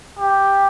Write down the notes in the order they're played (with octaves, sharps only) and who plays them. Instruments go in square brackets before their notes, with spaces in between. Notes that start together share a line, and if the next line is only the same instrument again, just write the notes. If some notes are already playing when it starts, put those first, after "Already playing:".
[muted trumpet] G4